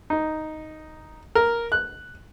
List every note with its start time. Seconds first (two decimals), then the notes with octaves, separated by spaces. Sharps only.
0.10 D#4
1.35 A#4
1.72 F#6